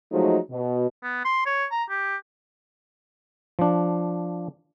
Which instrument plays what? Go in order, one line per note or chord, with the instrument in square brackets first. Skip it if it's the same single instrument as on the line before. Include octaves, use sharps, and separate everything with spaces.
[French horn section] F3 F#3 G#3 A3 D#4
B2
[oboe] B3
C6
C#5
A#5
G4
[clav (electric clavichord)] F3 D4